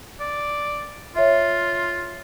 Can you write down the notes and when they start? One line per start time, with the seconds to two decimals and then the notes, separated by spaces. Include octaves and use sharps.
0.20 D5
1.16 F4 C#5 E5